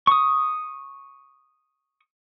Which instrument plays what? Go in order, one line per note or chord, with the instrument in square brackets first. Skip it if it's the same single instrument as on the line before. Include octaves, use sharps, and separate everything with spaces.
[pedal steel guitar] C#6 D#6